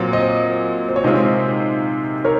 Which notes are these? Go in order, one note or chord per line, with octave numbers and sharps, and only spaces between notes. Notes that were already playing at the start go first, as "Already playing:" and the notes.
Already playing: A#2 F#3 C4
C5 D#5
C5
C#5
C3 D#3 G#3 C4 F4 C5 D#5
A#4 C#5